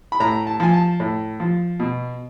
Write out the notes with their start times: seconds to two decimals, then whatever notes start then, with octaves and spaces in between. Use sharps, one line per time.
0.12 B5
0.20 A2 A#5
0.47 A5
0.60 F3 G#5
0.73 A5
1.00 A2
1.40 F3
1.79 B2